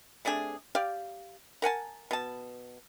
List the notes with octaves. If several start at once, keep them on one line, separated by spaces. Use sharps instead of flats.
C3 A3 D4 G#4
G4 D5 F5
A#4 F#5 G#5 A5
B2 A5